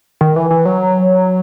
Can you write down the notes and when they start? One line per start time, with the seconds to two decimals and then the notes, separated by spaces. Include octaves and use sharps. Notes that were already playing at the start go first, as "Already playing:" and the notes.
0.21 D#3
0.36 E3
0.51 E3
0.66 F#3